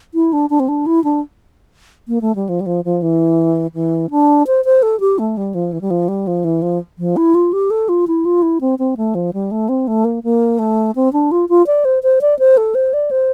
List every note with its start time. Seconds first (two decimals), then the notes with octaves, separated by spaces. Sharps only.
0.14 E4
0.33 D4
0.50 D4
0.60 C4
0.68 D4
0.86 E4
1.04 D4
2.08 A#3
2.21 A3
2.35 G3
2.49 F3
2.60 G3
2.66 F3
2.85 F3
3.02 E3
3.74 E3
4.10 D4
4.47 C5
4.65 C5
4.82 A4
5.00 G4
5.19 A3
5.37 G3
5.54 F3
5.72 E3
5.81 G3
5.90 F3
6.08 G3
6.27 F3
6.44 E3
6.62 F3
6.99 F3
7.16 E4
7.35 F4
7.53 G4
7.70 A4
7.89 F4
8.07 E4
8.25 F4
8.42 E4
8.61 C4
8.79 C4
8.97 A3
9.15 F3
9.33 G3
9.51 A3
9.69 C4
9.87 A3
10.04 A#3
10.23 A#3
10.59 A3
10.95 C4
11.13 D4
11.31 F4
11.49 F4
11.67 D5
11.85 C5
12.03 C5
12.21 D5
12.39 C5
12.57 A4
12.75 C5
12.93 D5
13.11 C5